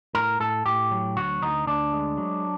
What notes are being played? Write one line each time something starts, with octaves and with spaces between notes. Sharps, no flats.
A2 A#4
A2 A4
A2 G4
F#3
D2 F#4
D2 D#4
D2 D4
G#3
F#3